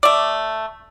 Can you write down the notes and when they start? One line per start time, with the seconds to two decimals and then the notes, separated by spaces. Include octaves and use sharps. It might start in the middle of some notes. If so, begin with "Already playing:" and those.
0.03 A3 D5